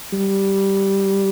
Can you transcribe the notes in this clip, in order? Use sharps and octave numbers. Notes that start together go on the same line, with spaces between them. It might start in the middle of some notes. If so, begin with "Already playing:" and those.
G3